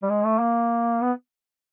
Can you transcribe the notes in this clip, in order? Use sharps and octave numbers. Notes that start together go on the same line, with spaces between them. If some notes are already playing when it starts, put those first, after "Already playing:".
G3
G#3
A3
A#3
B3